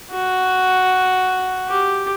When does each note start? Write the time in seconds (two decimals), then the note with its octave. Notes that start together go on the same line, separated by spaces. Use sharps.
0.12 F#4
1.68 G4